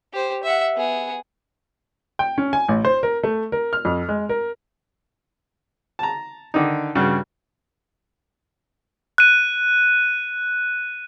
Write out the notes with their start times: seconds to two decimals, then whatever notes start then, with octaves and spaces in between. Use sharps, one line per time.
0.13 G4 C5
0.43 E5 F#5
0.76 B3 G#4
2.19 G5
2.38 C#4
2.53 G#5
2.69 A1
2.85 C5
3.03 A#4
3.23 A3
3.52 A#4
3.73 F6
3.85 F2
4.09 G#3
4.29 A#4
5.99 A5 A#5
6.54 D3 D#3 D#4
6.95 G2 C#3 F#4
9.18 F#6 D#7